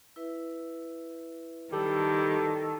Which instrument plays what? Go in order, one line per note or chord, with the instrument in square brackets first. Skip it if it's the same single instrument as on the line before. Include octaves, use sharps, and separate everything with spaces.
[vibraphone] E4 B4 E5
[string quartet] D#3 [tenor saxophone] G3 [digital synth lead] A4